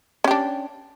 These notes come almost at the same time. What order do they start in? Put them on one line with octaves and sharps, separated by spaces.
C#4 G4 D4